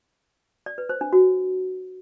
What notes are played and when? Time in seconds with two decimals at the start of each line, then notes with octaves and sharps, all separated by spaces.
0.66 D5
0.78 B4
0.89 C5
1.01 D4
1.13 F#4